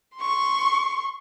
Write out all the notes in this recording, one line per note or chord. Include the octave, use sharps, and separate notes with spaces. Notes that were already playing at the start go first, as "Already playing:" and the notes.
C6 C#6